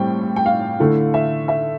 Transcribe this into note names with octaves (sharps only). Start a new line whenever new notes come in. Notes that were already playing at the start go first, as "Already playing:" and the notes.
Already playing: A2 G3 C4 G5
G5
F5
D3 A3 E4
E5
E5